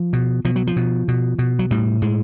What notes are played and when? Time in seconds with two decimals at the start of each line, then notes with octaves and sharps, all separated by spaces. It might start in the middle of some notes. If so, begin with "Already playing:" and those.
Already playing: F3
0.13 B2
0.45 B2 F3
0.56 F#3
0.67 F3
0.76 B2
1.08 B2
1.39 B2
1.59 F#3
1.71 A2 G3
2.02 A2 G#3